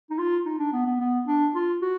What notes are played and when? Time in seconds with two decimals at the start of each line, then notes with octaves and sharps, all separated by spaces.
0.10 D#4
0.18 F4
0.45 D#4
0.59 D4
0.73 B3
0.86 B3
1.00 B3
1.27 D4
1.55 F4
1.82 F#4